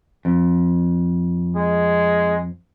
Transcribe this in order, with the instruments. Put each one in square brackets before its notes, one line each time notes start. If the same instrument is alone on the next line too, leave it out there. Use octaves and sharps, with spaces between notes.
[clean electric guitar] F2
[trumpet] G#3